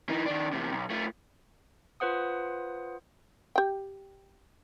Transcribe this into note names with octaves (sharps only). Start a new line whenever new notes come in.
E3 D#4
D#3 D4
E2 C3
B1
A3 F4
F4 B4 C5 F#5 D#6
G4 G5